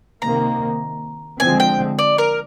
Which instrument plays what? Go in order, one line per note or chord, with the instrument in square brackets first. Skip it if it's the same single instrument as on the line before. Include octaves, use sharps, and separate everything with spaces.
[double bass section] C3 D#3 A#3 [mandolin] A#5
[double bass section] D3 F3 G#3 C4 [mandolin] G#5
[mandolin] G5
D5
A#4